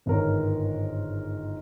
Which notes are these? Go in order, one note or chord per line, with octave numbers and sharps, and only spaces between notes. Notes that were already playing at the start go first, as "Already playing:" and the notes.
G1 G#2 D#3 A#4 C#5